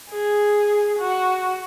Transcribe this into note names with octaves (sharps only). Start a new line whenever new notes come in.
G#4
F#4